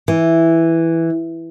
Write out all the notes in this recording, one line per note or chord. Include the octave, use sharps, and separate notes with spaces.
E3